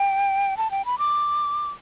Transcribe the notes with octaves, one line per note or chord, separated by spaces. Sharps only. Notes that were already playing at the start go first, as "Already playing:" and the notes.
Already playing: G5
A5
G5
B5
D6